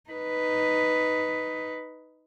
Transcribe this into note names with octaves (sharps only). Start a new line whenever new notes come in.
D#4 B4